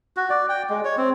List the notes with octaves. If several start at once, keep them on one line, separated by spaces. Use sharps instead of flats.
F#4
D5
G5
G#3
C#5
C4